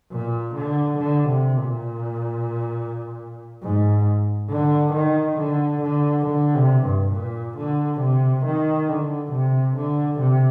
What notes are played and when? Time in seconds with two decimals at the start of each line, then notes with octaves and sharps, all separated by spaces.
0.11 A#2
0.55 D3
0.99 D3
1.29 C3
1.57 A#2
3.63 G#2
4.49 D3
4.93 D#3
5.38 D3
5.82 D3
6.26 D3
6.55 C3
6.85 G2
7.13 A#2
7.57 D3
8.01 C3
8.46 D#3
8.89 D3
9.32 C3
9.76 D3
10.20 C3